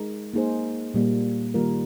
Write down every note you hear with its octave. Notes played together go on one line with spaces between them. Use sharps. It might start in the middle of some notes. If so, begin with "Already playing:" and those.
Already playing: G#3 D#4 A#4
A#3 D#4 G#4 C5
A#2 G3 A#3
D#3 G3 A#3 F4 A#4